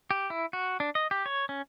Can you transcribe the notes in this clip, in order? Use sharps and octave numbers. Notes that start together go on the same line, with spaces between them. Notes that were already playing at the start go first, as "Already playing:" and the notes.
G4
E4
F#4
D4
D#5
G4
C#5
C#4